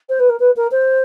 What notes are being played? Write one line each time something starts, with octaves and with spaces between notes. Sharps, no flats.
C5
B4
A#4
B4
A#4
C5